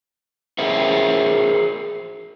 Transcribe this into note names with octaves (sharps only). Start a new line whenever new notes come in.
G#4 A#4 C5 E5